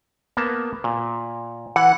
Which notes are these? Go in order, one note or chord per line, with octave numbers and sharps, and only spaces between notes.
A#3 B3 A5
A#2
E3 F#5